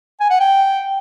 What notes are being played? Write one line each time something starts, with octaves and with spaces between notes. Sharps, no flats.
G#5
F#5
G5